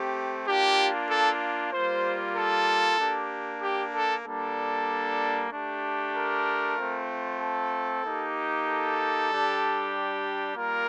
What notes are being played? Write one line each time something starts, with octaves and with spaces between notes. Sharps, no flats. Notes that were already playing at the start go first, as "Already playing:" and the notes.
Already playing: A3 C4 G4
A#3 D4 F4 G4
A4
G3 A#3 F4 C5
A4
A#3 D4 G4
G4
A4
G3 A#3 D4 A4
A3 D4 G4
A#4
A3 C4 F4
A4
A#3 D#4 G4
A4
G3 D4 G4
G3 A#3 F4 A#4